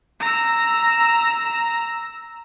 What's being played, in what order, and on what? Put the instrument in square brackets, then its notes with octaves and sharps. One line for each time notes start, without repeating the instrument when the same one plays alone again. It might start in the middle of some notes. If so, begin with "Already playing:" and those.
[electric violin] A#5 E6